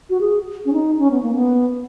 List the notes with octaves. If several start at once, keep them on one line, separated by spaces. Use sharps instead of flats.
F#4
G#4
C#4
D#4
C#4
B3
A#3
B3